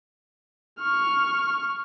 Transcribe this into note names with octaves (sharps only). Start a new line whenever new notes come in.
C#6 F6